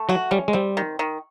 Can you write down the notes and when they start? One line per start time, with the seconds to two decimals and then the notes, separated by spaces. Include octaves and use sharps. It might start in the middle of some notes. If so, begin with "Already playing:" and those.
Already playing: A3
0.09 F#3 F#4
0.31 G3 C#4
0.48 G#3
0.53 G3 C4
0.77 D#3
0.99 D#3